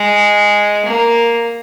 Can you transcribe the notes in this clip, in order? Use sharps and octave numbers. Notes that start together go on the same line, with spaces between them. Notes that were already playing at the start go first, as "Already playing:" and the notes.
Already playing: G#3
A#3